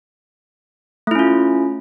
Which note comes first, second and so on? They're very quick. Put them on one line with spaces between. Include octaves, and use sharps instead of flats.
A3 E4 C#4 F4